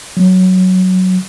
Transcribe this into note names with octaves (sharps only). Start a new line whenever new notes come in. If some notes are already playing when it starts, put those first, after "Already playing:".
F#3